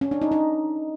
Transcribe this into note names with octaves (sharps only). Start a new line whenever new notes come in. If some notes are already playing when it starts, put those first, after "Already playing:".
C#4
D4
D#4
D#4